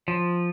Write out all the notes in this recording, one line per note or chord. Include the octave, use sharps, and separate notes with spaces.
F3